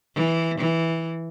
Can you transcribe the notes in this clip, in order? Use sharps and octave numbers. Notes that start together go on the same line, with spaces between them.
E3
E3